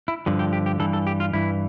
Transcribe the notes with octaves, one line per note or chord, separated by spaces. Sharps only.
E4
G2 D3 F3
G4
G4
G4
G2 E3 A4
A4
G4
F4
G2 E3 E4